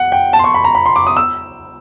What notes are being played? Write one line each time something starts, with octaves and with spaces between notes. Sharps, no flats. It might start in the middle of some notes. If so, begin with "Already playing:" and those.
Already playing: F#5
G5
A5
C6
C#6
B5
A#5
B5
C6
D6
D#6
E6